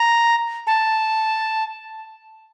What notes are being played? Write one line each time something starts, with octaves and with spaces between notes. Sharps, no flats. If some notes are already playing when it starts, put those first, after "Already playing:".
Already playing: A#5
A5